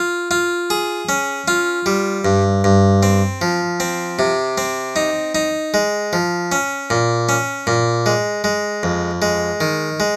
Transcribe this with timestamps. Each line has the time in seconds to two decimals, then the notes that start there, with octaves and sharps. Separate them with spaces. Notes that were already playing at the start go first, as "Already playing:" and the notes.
Already playing: F4
0.31 F4
0.70 G#4
1.09 C#4
1.48 F4
1.86 G3
2.25 G2
2.64 G2
3.03 C4
3.42 F3
3.80 C4
4.19 C3
4.58 C4
4.96 D#4
5.35 D#4
5.74 G#3
6.13 F3
6.52 C#4
6.90 A#2
7.29 C#4
7.67 A#2
8.06 G#3
8.44 G#3
8.83 F2
9.22 G#3
9.61 D#3
10.00 G#3